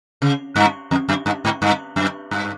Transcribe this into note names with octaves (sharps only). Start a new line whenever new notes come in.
C#3
G2
F2
F#2
G2
G#2
G2
F#2
G2